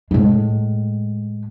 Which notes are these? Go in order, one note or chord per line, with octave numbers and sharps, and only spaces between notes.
A2 G#3